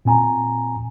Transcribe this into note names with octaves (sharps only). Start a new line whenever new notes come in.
A#2 C4 G#5 A#5